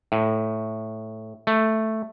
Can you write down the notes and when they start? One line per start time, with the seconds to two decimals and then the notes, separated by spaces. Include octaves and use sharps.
0.12 A2
1.47 A3